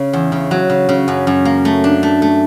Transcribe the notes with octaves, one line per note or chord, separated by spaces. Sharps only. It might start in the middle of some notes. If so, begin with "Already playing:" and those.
Already playing: C#3
E2
C#3
F#3
C#3
C#3
F#2
F#2
A#3
A3
D4
A3
A3